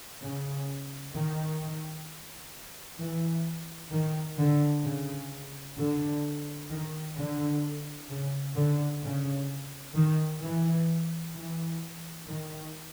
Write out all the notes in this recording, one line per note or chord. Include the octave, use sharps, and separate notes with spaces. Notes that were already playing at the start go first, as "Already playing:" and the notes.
C#3
D#3
E3
D#3
D3
C#3
D3
D#3
D3
C#3
D3
C#3
D#3
E3
E3
D#3